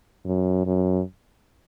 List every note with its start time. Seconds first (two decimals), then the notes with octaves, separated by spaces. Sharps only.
0.25 F#2
0.66 F#2